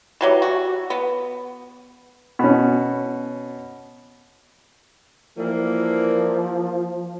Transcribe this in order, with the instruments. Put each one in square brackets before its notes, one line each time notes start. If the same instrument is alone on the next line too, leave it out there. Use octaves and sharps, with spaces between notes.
[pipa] E3 F#3 G3
F#4
B3
[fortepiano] B2 C#4
[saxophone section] E3 G3 A#3 [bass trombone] F3